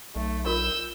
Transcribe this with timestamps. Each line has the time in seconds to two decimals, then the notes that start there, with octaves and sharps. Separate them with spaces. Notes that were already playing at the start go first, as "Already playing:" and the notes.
0.16 B1 A3
0.46 F4 A#4 E6 G6